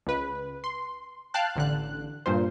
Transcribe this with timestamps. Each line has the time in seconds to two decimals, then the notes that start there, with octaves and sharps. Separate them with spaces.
0.07 C#2 B4
0.64 C6
1.34 F5 G5 A5 F#6
1.56 A1 D3 F#6
2.26 G2 A#2 C5